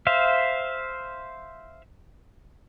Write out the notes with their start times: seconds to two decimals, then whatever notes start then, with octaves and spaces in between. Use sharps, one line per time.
0.07 C5 E5 F5